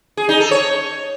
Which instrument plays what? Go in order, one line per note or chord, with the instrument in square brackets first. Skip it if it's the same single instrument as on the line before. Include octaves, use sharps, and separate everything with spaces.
[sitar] G#4
D#4
A4
C#5